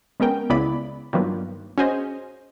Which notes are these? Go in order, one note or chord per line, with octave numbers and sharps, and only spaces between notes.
G#3 B3 C#4 A#4 G5
C#2 C#3 B3 E4 D5 B5
G2 D#3 F#3 A#3 B3 F4
C#4 F#4 G#4 C5 D#5